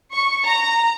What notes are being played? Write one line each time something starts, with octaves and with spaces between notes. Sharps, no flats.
C#6
A#5